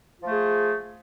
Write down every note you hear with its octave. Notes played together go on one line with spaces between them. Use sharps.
F3 A3 F4 G#4